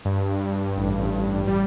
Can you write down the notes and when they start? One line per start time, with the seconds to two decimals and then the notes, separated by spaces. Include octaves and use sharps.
0.05 G2
0.41 G2
0.76 A1
1.13 A1
1.48 G3